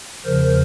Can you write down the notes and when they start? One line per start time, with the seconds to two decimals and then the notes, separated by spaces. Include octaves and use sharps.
0.25 E2 C#3 F3 A#4 C5